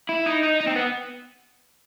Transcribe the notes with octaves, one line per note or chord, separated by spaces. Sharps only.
E4
D#4
D#4
D#4
C4
B3